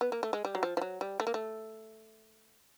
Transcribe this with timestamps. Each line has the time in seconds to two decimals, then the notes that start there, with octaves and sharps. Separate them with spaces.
0.01 B3
0.12 A#3
0.23 A3
0.33 G#3
0.45 G3
0.55 F#3
0.63 F3
0.77 F3
0.81 F#3
1.01 G3
1.20 A3
1.27 A#3
1.34 A3